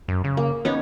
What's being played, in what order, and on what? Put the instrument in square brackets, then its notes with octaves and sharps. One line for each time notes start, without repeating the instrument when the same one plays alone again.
[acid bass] F#2
C#3
[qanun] A#3
[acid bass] B3 [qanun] C#4 D#4 C#5